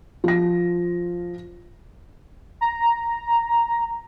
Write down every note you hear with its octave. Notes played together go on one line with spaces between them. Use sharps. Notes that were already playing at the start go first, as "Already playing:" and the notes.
F3 A#6
A#5